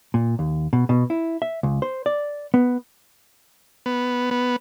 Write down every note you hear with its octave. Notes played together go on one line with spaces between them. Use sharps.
A#2
D#2
B2
B2
E4
E5
C#2
C5
D5
B3
B3
B3